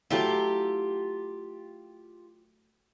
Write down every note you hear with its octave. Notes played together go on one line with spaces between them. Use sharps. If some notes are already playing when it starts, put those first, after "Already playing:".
F#3 A3 E4 F4 G4